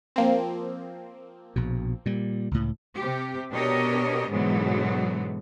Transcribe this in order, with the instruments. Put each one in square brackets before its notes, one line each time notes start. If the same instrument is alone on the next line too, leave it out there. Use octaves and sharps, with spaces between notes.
[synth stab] F3 A#3 C4
[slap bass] A#1 B2
A#2 G3
C#2 A2
[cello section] C3 G4
B2 D4 G4 A#4 C#5 D#5
G#2 B2 D3 E3 F#3 G#3